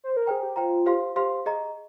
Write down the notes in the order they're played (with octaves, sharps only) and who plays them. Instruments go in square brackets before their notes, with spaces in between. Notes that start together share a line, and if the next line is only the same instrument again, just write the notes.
[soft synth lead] C5
A#4
[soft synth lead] G#4 [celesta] C5 G5 A#5
[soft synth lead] G4
[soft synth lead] F4 [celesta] C5 G5 A#5
[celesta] G4 C5 F5 C6
G4 C5 F5 C6
G#4 D#5 A#5